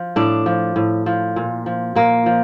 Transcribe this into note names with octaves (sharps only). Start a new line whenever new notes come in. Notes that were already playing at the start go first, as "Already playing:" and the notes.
Already playing: F3
A2 D4
F3
A2
F3
A#2
F3
A#2 A#3
F3